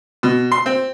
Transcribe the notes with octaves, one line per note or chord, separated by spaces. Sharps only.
B2
C6
C4